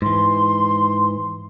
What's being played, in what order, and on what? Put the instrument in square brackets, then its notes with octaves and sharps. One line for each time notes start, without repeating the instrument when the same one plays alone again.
[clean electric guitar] G#2 E3 [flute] C6